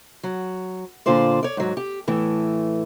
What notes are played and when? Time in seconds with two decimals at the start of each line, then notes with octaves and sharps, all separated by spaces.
0.23 F#3
1.06 A#2 D3 F4 C5 D5
1.43 C#5 D5
1.57 G#2 F#3
1.77 G4
2.08 A2 E3 A3